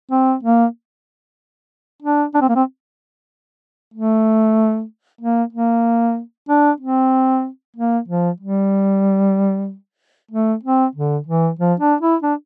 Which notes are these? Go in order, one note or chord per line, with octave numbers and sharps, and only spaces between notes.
C4
A#3
D4
D4
C4
A#3
C4
A3
A#3
A#3
D4
C4
A#3
F3
G3
A3
C4
D3
E3
F3
D4
E4
D4